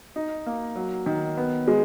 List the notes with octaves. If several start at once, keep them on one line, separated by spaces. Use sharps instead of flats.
D#4
A#3
F#3
D#3
B3
G#3